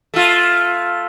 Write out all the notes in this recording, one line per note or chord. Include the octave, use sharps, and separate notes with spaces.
A3 F4